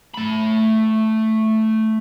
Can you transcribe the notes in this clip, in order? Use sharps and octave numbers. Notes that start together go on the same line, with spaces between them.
A3 B5